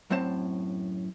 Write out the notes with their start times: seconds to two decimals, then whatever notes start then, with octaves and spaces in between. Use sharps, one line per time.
0.11 F#2 A2 C4 C5 A5